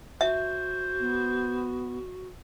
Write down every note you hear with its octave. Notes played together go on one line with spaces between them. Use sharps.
F#4 C5 E5
B3